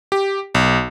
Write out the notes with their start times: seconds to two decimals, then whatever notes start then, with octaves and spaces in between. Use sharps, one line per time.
0.12 G4
0.55 B1